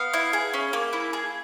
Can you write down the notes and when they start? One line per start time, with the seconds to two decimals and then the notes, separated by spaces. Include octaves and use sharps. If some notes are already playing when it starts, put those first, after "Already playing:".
Already playing: B3 F5
0.13 E4
0.33 G#4
0.54 C#4
0.73 A#3
0.93 E4
1.13 G#4